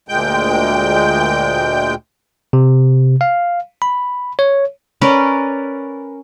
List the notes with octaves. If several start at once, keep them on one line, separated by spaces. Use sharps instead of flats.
D2 A#2 G#3 G5 G6
C3
F5
B5
C#5
C#4 A#4 B4 D5